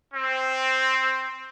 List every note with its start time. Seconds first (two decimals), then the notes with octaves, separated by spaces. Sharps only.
0.13 C4